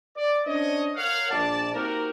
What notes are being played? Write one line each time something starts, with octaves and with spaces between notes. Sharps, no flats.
D5
C#4 D4 C5 C#5 D#5
A#4 C#5 F5 F#5
A#1 D5 A5
A#3 C4 D#4 F#4 G4 A#4